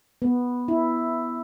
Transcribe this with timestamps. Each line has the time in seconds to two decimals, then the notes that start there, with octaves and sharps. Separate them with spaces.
0.22 B3
0.68 E4